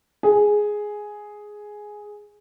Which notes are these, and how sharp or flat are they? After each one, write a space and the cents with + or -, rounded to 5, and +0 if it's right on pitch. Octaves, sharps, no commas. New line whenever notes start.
G#4 +5